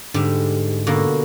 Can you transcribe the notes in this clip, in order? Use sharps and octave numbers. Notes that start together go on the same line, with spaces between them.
G#2 D3 G3
B2 D3 A#3